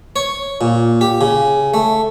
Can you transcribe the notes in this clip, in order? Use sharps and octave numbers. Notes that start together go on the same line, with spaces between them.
C#5
A#2
G4
C#3
A3